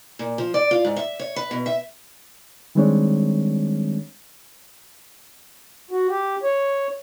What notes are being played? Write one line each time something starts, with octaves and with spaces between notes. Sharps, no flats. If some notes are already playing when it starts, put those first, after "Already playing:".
A#2
F3
D5
F4
G#2
E5
C#5
B4
B2
E5
D#3 G3 G#3 C4 D4 C#5
F#4
G4
C#5